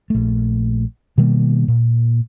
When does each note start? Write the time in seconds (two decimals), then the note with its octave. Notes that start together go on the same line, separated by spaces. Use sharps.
0.10 A#1 A3
1.18 B2 D#3 G3 A#3
1.68 A#2